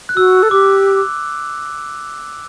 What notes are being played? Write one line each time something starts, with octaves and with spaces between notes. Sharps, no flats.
F#6
F#4 E6
A4
G4 D6